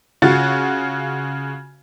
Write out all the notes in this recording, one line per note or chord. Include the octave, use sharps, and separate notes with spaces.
C#3 F4 F#4 A6